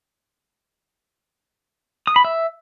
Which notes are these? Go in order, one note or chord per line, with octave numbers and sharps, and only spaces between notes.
D#6
B5
E5